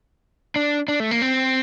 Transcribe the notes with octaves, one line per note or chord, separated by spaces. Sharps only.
D4
D4
A3
A#3
C4